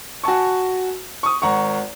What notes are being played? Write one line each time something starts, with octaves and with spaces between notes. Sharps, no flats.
F#4 G#5 A5 C#6
C#6 D#6
G#1 F#5 A#5 C#6